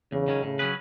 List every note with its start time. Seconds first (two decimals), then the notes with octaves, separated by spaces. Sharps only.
0.12 E2 C#3
0.28 D#3 F#3 C#4
0.43 A2 C#3
0.59 F#3 C#4 G#4 B4